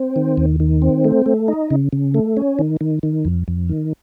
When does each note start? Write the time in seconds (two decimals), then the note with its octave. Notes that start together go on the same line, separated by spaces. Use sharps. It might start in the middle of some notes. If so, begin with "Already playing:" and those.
Already playing: C4
0.16 D#3
0.37 D#2
0.60 D#3
0.82 C4
1.05 A3
1.26 A3
1.48 D#4
1.71 C#3
1.93 C#3
2.14 A3
2.37 C#4
2.59 D#3
2.81 D#3
3.03 D#3
3.25 F2
3.48 F2
3.69 D#3